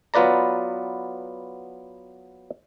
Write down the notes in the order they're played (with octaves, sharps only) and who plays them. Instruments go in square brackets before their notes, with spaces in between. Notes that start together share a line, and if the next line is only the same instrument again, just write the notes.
[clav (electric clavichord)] F#3 B3 F4 B4 D5 A#5